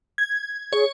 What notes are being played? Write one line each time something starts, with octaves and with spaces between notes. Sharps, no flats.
G#6
G#4 C#5